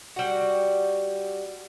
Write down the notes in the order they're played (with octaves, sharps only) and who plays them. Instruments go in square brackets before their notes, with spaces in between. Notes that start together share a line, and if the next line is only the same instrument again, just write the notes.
[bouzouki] G3 F#4